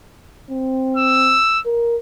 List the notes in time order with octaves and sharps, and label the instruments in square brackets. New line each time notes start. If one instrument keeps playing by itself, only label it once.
[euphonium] C4
[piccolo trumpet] E6
[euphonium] A#4